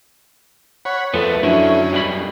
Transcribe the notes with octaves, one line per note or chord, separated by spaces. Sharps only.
C#5 F#5 B5
F2 A3 B3
F#2 D3 C#4 E4
G2 B2 B5